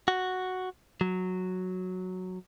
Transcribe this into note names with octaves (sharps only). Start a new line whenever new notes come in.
F#4
F#3